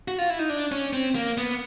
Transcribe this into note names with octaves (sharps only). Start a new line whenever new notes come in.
F#4
F4
E4
D#4
D4
C#4
C4
A#3
B3